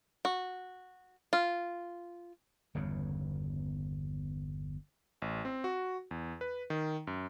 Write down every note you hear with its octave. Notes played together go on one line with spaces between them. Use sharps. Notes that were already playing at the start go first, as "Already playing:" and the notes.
F#4
F4
G1 E2 C#3
A1
C4
F#4
E2
B4
D#3
F#2